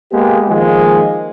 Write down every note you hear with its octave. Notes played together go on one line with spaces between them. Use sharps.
G#3 A#3 B3 G4
D#3 F3 G#3 A#3 G#4